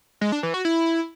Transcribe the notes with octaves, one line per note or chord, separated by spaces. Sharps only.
G#3
D4
E3
F#4
E4